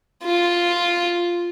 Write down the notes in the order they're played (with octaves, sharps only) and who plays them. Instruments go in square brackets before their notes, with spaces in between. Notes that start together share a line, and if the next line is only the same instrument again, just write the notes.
[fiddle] F4